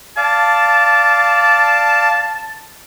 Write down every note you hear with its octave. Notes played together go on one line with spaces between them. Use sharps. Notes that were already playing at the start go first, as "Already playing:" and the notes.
D5 F5 A5